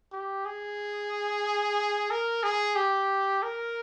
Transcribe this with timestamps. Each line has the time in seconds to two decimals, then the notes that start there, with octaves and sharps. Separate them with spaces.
0.12 G4
0.45 G#4
2.10 A#4
2.43 G#4
2.75 G4
3.43 A#4